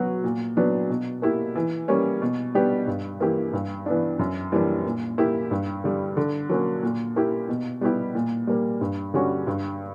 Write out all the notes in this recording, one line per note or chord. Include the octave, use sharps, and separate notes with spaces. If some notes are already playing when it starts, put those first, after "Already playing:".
Already playing: F#3 B3 F#4
A#2
F#3 B3 D4
B2
A#3 E4 G4
E3
G3 A#3 C#4
B2
G3 B3 D4 G4
G2
E3 A#3 E4 G4
G2
E3 B3 D4
F#2
E3 G3 A#3 D4
A#2
A#3 E4 G4
G2
D3 G3
D3
F#3 A#3 C#4
A#2
A#3 E4 G4
B2
G3 B3 E4 G4
A#2
G3 A#3
G2
D3 G3 C#4 F#4
G2